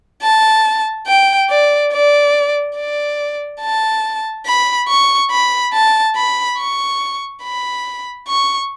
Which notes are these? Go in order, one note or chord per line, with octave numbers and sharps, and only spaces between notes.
A5
G5
D5
D5
D5
A5
B5
C#6
B5
A5
B5
C#6
B5
C#6